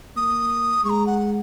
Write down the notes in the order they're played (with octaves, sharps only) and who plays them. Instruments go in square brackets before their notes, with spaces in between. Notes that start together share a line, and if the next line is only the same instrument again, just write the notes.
[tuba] A#3 [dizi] D#6
[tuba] G#3 [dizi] C#6
[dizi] A#5
F#5